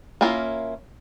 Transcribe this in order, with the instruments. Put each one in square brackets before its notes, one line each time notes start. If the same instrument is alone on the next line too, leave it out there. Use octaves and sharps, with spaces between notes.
[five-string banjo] A#3 C#4 E4 F4 A#4